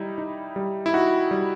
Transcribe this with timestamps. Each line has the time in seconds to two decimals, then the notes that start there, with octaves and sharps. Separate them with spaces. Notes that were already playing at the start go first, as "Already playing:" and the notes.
Already playing: G3 D#4 E4
0.18 D#4
0.56 G3
0.86 E4
0.93 D#4 F#4
1.31 G3